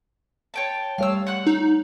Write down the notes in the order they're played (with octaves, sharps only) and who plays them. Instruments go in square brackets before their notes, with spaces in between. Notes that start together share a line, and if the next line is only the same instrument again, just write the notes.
[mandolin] C#5 G5 A5
[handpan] G3 A3 C#5 [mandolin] F5 E6
[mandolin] F#5 F#6
[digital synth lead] D#4